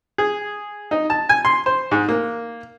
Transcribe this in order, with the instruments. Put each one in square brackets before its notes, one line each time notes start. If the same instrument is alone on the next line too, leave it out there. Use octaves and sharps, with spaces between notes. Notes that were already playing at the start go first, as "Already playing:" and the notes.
[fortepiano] G#4
D#4
A5
G#5
C6
C5
G#2
A#3